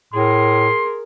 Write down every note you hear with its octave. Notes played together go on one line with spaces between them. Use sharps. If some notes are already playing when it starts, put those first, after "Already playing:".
A2 G#4 A#4 C6